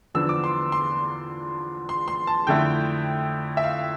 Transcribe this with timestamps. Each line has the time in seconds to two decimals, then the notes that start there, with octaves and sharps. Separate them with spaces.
0.14 E2 D3 F3 B3 D4 E6
0.29 D6
0.44 C6
0.72 C6
1.89 C6
2.08 C6
2.27 A5
2.47 F2 D3 A3 E4 G5
3.57 E5
3.64 F5